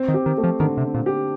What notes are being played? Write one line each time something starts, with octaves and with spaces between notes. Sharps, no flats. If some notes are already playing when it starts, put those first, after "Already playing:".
Already playing: C4
D#3
G4
D#3
A3
F3
D3 D#3
C3
C4
A#2
G4